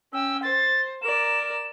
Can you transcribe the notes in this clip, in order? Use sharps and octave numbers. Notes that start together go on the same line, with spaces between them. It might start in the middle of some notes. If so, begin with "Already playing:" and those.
C#4 G5 E6
C5 A6
A#4 D5 E7